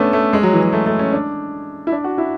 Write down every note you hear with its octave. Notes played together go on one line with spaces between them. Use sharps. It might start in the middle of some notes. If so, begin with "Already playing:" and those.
Already playing: A3 B3 C#4 D4
A3
G#3
F#3
E3
F#3
A3
A3
C#4
D4
E4
D4
F#4
E4